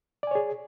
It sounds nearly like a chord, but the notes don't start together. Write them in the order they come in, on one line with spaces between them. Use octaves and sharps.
D5 G#5 C#5 G#4